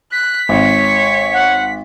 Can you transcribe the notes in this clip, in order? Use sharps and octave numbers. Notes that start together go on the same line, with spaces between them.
F#6 B6
G#1 C#5
F#5